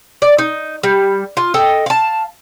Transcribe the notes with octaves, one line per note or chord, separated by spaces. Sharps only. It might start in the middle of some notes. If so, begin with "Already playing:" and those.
D5
D#4
G3
F4
A4 D#5 G5
F5 A5